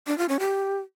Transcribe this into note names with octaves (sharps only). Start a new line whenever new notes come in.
D4
F4
C#4
G4